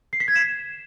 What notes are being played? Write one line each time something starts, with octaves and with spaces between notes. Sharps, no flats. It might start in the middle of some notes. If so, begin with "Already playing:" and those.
C7
B6
G#6
E7